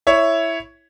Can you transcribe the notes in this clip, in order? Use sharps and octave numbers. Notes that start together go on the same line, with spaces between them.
E4 C#5 E5